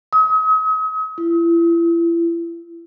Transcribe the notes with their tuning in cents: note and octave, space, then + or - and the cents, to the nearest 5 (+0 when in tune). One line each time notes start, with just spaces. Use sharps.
D#6 +40
E4 +35